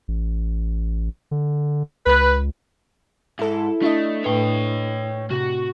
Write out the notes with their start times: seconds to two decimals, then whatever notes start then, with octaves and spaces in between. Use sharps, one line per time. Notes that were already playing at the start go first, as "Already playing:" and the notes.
0.08 A1
1.31 D3
2.06 C#2 B4
3.39 G#2 E4 A4
3.82 A3 D4 E4 D#5
4.24 A2 A3 B4 C#5 G5
5.31 C3 F#4